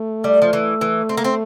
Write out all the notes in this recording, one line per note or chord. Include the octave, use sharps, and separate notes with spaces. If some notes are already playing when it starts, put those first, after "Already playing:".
Already playing: A3
G3
F3
E3
E3
C4
A#3
C4